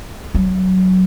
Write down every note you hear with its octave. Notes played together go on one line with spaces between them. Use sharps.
F#3